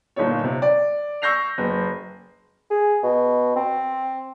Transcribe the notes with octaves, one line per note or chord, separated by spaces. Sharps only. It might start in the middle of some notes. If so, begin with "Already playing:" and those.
G1 A#2 D#4 F4 C#5
C3
D5
C#6 E6 G6 A#6 C7 F7
F#1 B4
G#4
B2
C4